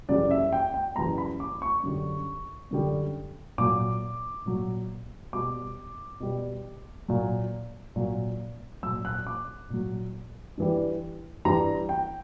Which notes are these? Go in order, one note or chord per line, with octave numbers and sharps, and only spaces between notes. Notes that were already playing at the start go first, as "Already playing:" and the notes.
F#2 C#3 E3 G3 D5
E5
G5
G5
F#2 C#3 E3 G3 A#5
B5
D6
C#6
F#2 D3 G3
F#2 D3 G3
A#2 F#3 D6
A#2 F#3
B2 G3 D6
B2 G3
A#2 F#3
A#2 F#3
A#2 F#3 E6
F#6
D6
A#2 F#3
G2 E3 G3
G2 E3 G3 A#5
G5